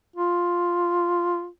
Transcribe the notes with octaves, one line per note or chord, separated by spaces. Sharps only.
F4